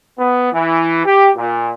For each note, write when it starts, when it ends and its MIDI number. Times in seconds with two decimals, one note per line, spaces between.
0.19 0.53 59
0.53 1.02 52
1.06 1.30 67
1.37 1.71 46